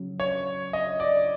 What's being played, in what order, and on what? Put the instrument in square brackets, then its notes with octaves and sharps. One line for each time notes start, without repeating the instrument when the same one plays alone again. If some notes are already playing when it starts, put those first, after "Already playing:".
Already playing: [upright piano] C#3 F#3
[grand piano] C#5
D#5
D5